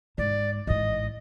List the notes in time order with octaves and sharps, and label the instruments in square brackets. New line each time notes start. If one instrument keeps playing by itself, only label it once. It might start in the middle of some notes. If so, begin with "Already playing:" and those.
[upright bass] G#2 [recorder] D5
[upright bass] A1 G#2 [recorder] D#5